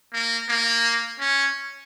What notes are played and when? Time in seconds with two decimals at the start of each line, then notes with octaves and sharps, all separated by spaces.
0.13 A#3
0.48 A#3
1.20 C#4